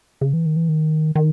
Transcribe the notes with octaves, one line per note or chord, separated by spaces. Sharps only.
C#3
E3
D#3
E3
D#3
D#3